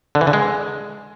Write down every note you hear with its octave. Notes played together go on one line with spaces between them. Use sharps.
D3
E3
D3
G#3